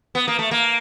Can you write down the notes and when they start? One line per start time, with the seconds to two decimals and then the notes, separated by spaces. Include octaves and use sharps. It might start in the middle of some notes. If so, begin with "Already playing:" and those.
0.15 B3
0.28 A#3
0.39 A3
0.51 A#3